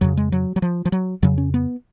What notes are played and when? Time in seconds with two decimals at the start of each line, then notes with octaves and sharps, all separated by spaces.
0.01 F2 C#3 F#3
0.17 G#3
0.32 F#3
0.56 F#3
0.62 F3
0.85 F3
0.92 F#3
1.22 F2 C#3 F#3
1.38 C#4
1.54 B3